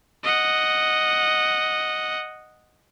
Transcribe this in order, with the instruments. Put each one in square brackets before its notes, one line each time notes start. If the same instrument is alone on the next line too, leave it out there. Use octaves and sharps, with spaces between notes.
[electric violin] D#5 F#5